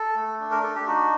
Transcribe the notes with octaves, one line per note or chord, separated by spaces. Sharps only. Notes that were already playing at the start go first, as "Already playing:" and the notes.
Already playing: A4
A3
D4
A#4
D4 A4
G4
D#4 F#4